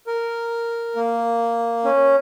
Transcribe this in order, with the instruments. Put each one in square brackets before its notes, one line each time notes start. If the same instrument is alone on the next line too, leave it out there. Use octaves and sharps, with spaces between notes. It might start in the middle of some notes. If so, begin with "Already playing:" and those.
[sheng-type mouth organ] A#4
A#3
C#4